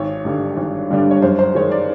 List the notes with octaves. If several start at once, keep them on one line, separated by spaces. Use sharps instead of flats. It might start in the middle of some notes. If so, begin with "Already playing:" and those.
Already playing: G#1 C#5
G2 D3 G3
G#1
G2 D3 G3
D5
C#5
F#2 C5
C5
D#3 G#3 C#5
D5